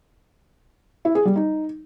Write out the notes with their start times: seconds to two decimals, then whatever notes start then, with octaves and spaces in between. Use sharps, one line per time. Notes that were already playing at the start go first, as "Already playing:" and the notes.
1.05 E4
1.15 G#4
1.25 G3
1.36 D#4